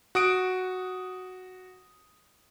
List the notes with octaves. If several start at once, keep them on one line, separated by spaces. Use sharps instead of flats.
F#4 D#6 D7